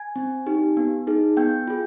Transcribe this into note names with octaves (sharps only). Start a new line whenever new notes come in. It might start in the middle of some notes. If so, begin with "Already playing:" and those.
Already playing: G#5 G#6
C4
D#4 G4
B3
D#4 G#4
B3 G5 G6
F4 G#4